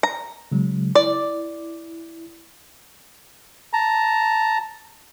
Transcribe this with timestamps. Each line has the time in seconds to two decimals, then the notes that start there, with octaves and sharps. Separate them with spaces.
0.03 A#5
0.52 C#3 F#3 G#3
0.95 E4 D5
3.73 A5 A#5